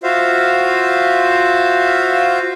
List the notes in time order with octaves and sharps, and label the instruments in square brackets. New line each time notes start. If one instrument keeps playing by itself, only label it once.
[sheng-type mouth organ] F4 F#4 C5 E5 F5